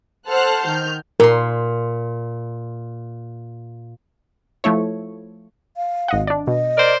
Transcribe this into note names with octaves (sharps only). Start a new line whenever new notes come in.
A4 C5 F#5 A5 F6 F#6
D#3 F6 G6
A#2 A#4 C6
F3 A3 E4 C#5
F5
G#1 D#5 F#5
D4 D5
B2 D#5
A#4 C5 D5